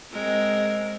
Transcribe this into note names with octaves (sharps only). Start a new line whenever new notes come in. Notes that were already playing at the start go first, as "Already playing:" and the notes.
G#3 C4 A#4